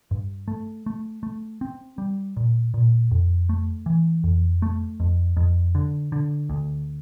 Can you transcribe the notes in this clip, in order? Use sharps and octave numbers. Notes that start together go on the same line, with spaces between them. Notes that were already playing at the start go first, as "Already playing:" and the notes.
G2
A3
A3
A3
C4
G3
A#2
A#2
F2
A3
E3
F2
A3
F2
F2
D3
D3
D2